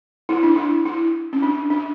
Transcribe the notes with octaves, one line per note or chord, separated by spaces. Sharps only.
E4
D4
E4
E4
C#4
D4
D4